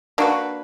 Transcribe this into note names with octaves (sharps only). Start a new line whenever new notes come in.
A#3 D4 F#4 B4